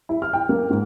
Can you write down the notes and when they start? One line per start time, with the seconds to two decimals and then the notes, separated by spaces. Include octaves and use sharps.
0.09 E4
0.22 F6
0.33 G5
0.49 A#3
0.70 G#2